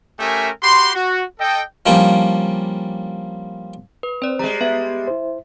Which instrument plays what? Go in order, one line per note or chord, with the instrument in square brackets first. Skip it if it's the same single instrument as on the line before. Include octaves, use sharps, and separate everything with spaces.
[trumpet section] A3 C#4 G4 A#4 E5 G#5
F#4 G4 B5 C6
F#4
A4 D#5 G5
[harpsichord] F3 G3 A#3 C#4 D4
[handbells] B4
[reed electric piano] C4 [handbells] C5 D5
[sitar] G3 G#3 [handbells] A#5
[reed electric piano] B3 [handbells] E5
[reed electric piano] E4 C5